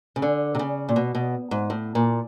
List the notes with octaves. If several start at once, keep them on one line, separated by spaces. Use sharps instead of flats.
C#3
D3
C3
C#3
A#2
B2
B2
G#2
A2
A#2